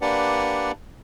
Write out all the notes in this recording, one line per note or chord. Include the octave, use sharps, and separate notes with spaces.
A#3 D4 G4 B4 D5 F#5